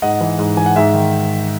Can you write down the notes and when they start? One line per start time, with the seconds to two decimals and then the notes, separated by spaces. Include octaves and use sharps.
0.02 G#2 D#5 F#5
0.21 E3
0.39 G#2
0.57 E3 G#5
0.66 F#5
0.76 G#2 E5
0.94 D#3